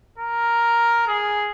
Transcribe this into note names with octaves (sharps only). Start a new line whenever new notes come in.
A#4
G#4